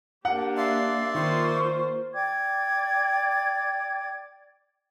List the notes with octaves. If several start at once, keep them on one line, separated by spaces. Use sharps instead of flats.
A#3 D4 G4 F#5
D5 E5 F5 C6
D#3 A#3 F4 C5 C#6
D5 G5 D6 G#6